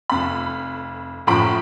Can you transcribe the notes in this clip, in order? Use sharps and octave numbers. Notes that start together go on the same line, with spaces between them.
F1 F2 B5
F#1 A2 F3 A#5 B5 D7